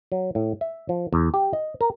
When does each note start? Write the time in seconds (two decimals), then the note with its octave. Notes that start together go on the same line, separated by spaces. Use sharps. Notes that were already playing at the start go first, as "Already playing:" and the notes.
0.12 F#3
0.35 A2
0.61 E5
0.89 F3
1.13 E2
1.34 G4
1.53 D#5
1.81 A#4